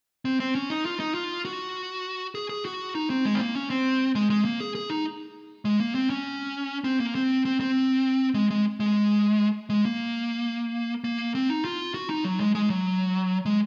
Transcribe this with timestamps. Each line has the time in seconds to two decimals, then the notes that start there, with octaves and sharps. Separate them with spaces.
0.25 C4
0.40 C4
0.55 C#4
0.70 D#4
0.85 F4
1.00 D#4
1.15 F4
1.45 F#4
2.35 G#4
2.49 G#4
2.65 F#4
2.95 D#4
3.10 C4
3.25 G#3
3.35 C4
3.40 A#3
3.55 C#4
3.70 C4
4.15 G#3
4.30 G#3
4.45 A#3
4.60 G#4
4.75 G#4
4.90 D#4
5.65 G#3
5.80 A#3
5.95 C4
6.10 C#4
6.84 C4
7.00 A#3
7.15 C4
7.45 C4
7.60 C4
8.34 G#3
8.50 G#3
8.80 G#3
9.70 G#3
9.85 A#3
11.04 A#3
11.35 C4
11.49 D#4
11.65 F4
11.94 F#4
12.10 D#4
12.25 F#3
12.40 G#3
12.55 G#3
12.70 F#3
13.45 G#3